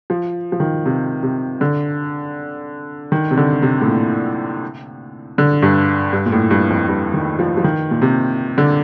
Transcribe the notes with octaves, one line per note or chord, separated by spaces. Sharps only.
F3
F3
D#3
C3
C3
D3
D#3
C3
D3
C3
A2
A#2
D3
G2
G2
A#2
A2
G2
F2
G2
D#3
F3
F3
D#3
A#2
C3
D3